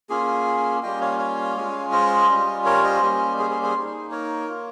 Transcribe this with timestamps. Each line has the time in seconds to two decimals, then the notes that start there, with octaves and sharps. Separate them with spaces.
0.09 A#3 C#4 F4 G#4
0.83 G3 A#3 C#4 F4 D#5 G5
1.01 C#5 F5
1.19 C#5 F5
1.56 G#3 C#4 F4
1.92 C5 D#5
2.29 G3 C#4 F4
2.65 A#4 C#5
2.84 C5 D#5
3.02 G3 A#3 C#4
3.38 G#4 C5
3.50 G#4 C5
3.63 G#4 C5
3.76 A#3 D#4
4.11 A#4 C#5
4.48 A#3 F4